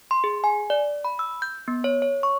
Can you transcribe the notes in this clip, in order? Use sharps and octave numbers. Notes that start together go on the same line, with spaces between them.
C6
G#4
G#5
D5
B5
E6
G6
B3
C#5
C#5
C#6